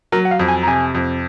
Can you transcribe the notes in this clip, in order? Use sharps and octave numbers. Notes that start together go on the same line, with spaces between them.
F#3 A#4
F#5
F5
F2
G#5
A#5
C3 G#5
F2